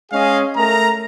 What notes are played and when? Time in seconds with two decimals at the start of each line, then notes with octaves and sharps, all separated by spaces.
0.12 G#3 C#4 G#4 D#5 F5
0.57 A3 A#4 A#5